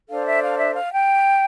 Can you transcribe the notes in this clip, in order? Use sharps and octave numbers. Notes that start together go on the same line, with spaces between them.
D4 A4 C5 F5
E5
F5
E5
F5
G5